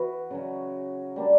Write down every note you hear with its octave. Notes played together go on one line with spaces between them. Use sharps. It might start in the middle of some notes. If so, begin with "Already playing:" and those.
Already playing: E3 B3 F#4 B4
C#3 F#3 C#4
G3 A#3 D4